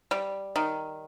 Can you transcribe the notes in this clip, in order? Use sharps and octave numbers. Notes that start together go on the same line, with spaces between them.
G3
D#3